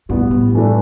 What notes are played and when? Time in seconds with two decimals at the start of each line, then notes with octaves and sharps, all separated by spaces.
0.09 A2 G3 B3 E4
0.31 A2
0.54 G2 E3 A3 D4